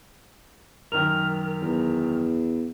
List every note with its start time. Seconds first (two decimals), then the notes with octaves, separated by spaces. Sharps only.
0.92 F#2 D#3 A#4
1.61 E2